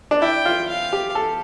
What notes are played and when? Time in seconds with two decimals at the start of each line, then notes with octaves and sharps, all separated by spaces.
0.11 D4
0.22 E4 G5
0.45 F4
0.69 F5
0.93 G4
1.15 A4